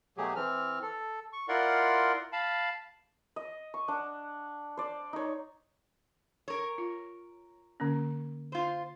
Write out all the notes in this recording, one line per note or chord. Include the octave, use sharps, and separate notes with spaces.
B2 F#3 A3 G4 G#4
E3 C4 F6
A4
C#6
E4 F4 A#4 D5 F#5 C6
F5 A5 B5
D#5
C#6
D4 F#5
C5 D5
D#4 C#5
A#4 C#5
F4
D3 A#3 C#4
F4 C5